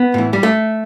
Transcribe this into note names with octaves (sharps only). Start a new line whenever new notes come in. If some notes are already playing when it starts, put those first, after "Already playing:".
Already playing: B3
A2 E3
G3
A3